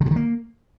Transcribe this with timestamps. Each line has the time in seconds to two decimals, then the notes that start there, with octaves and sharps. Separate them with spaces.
0.01 D3
0.06 C3
0.11 D#3
0.16 A#3